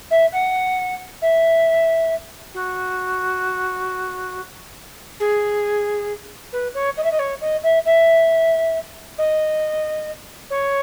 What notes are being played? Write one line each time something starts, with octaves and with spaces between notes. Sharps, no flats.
E5
F#5
E5
F#4
G#4
B4
C#5
D#5
E5
D#5
C#5
D#5
E5
E5
D#5
C#5